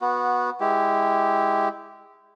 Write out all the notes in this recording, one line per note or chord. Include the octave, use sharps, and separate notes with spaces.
B3 F#4
G#3 E4 G4